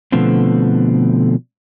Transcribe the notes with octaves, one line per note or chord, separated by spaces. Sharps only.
B2 D3 F3 A3 B3 C4